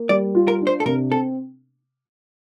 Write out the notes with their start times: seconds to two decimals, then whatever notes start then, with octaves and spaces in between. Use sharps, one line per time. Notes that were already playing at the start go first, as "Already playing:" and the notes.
Already playing: A#3
0.09 G3 D5
0.35 F4
0.48 A#4
0.61 D4
0.67 C5
0.80 A4
0.86 C3 A#4
1.11 C4 A4